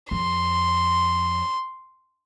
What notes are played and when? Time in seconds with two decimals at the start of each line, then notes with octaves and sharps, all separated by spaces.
0.11 F2 C6